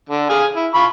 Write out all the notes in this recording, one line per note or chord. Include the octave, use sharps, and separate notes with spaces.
D3
G#4 F5 G#5
E4
F4 B5 C#6